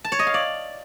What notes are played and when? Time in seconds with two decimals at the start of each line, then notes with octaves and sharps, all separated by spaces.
0.04 A5
0.12 C#5
0.19 D#5
0.27 F5
0.34 D5